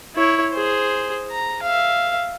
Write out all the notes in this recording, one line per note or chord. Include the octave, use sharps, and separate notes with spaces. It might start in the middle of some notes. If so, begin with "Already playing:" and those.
E4 C#5
G#4 C5
A#5
E5 F5